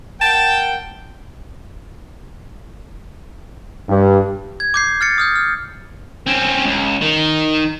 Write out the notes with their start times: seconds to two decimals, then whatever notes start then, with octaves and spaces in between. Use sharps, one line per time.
0.21 A#4 F#5 G5 A5
3.89 G2
4.60 G#6
4.74 D6 G6 C7
5.01 F6 A6 C#7
5.18 D#6 F6 G6
5.35 F6
6.27 C4 C#4
6.65 C#2
7.01 D#3 D#4